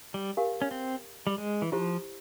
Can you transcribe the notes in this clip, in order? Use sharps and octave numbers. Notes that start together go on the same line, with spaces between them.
G3
G4 A#4 F5 G#5
C#4
C4
G3
G#3
E3
F3 E4 G4 C5